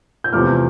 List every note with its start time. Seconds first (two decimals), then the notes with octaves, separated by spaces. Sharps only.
0.24 G6
0.33 E2 C3 F3 A3 D6 F6